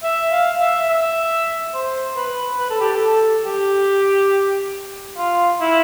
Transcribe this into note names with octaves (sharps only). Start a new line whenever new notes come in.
E5
F5
E5
E5
C5
B4
B4
A4
G4
A4
G4
F4
E4